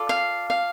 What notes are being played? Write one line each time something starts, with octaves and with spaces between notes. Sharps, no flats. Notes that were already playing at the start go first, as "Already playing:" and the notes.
Already playing: F4 A4 D5
F5
F5